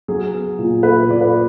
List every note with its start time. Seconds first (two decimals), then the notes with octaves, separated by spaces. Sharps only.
0.08 F#3 G#4
0.34 B3
0.58 A#2
0.83 A#2 B4
1.09 A#2 D5
1.21 B4